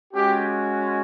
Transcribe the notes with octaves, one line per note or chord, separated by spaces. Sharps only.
G#3 C#4 F#4 G4